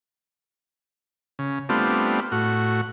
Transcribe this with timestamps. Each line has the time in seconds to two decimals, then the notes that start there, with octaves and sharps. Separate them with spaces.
1.39 C#3
1.69 G3 A3 B3 C4 D4 F4
2.32 A2 F#4